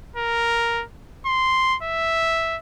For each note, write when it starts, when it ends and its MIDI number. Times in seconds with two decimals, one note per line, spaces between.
0.16 0.84 70
1.26 1.76 84
1.83 2.57 76